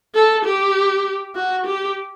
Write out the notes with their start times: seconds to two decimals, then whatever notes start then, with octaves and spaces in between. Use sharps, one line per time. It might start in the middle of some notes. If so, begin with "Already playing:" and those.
0.15 A4
0.45 G4
1.36 F#4
1.66 G4